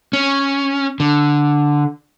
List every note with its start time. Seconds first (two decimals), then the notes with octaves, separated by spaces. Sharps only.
0.13 C#4
1.00 D3